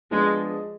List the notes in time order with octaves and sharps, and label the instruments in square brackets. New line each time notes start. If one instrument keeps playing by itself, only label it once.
[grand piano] F3 B3 D4 G#4 D#5 [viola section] G#3